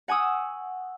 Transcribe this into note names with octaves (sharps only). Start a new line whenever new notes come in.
F#5 G#5 C#6 D#6 E6